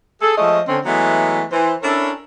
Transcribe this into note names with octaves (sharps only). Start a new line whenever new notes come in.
G#4 A4
F3 G#3 A3 C#5 D#5
D3 C4 C#4
E3 F#3 G#3 A3 B3
E3 C5
C#4 D4 E4 A4 A#4 C#5